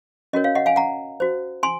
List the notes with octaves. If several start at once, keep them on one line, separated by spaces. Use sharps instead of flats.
C#4 F#4 A#4 C#5 D#5
C#5 F5
D#5 F#5
F5 G#5
F#5 A#5
F#4 C5
G#5 C6